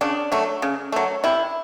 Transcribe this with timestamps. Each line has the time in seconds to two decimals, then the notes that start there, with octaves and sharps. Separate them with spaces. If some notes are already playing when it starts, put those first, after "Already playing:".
0.01 C#3 D4
0.32 F#3 A3
0.62 C#3
0.92 F#3 A3
1.24 C3 E4